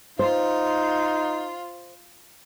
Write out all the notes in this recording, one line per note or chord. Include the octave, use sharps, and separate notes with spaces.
D#4 F4 C5